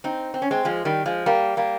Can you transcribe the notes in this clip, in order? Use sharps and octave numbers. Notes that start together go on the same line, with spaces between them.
C4 D#4
C4
C#4
G#3 C4
F3 G#3
D#3 G3
F3 G#3
G3 A#3
G3 A#3